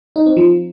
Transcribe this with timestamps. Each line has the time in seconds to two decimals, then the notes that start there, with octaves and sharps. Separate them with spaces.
0.16 D#4
0.26 C4
0.37 F3